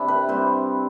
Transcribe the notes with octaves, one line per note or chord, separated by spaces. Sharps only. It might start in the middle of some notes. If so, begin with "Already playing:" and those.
Already playing: C3 D4 E4
B4
G3 C4 C5